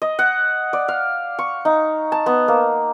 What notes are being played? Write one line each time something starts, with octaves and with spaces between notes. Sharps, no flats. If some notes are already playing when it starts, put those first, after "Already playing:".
D#5
F#5
D5
F5
C#6
D#4
A5
B3
A#3